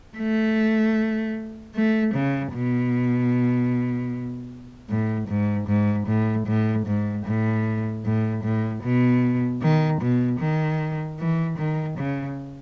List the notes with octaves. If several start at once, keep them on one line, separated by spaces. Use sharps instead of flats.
A3
A3
C#3
B2
A2
G#2
G#2
A2
A2
G#2
A2
A2
A2
B2
D#3
B2
D#3
E3
D#3
C#3